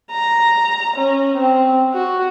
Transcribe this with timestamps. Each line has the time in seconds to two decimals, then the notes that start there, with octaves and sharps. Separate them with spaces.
0.11 A#5
0.96 C#4
1.36 C4
1.93 F#4